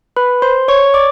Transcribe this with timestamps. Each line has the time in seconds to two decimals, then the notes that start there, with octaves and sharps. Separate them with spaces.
0.16 B4 B5
0.42 C5 C6
0.68 C#5 C#6
0.94 D5 D6